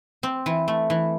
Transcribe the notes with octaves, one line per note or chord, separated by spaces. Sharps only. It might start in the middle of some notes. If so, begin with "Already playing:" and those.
C4
E3
A3
E3